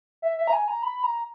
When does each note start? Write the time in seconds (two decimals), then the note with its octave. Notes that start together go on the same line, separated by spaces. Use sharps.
0.22 E5
0.37 E5
0.48 A#5
0.53 G#5
0.68 A#5
0.83 B5
1.03 A#5